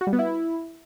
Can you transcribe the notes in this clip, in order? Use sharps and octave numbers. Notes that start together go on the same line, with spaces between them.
F#4
G3
B3
E4